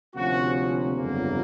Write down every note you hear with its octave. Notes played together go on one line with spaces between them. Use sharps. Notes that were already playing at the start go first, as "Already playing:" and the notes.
D2 C3 F3 A#3 C#4 F#4
G1 F2 C#3 F#3 A#3